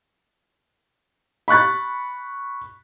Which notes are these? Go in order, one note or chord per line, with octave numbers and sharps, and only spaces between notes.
B5 C#6 F#6 A6